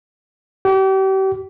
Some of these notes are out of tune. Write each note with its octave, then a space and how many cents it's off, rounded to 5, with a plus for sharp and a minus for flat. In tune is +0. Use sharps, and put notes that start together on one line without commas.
G4 -35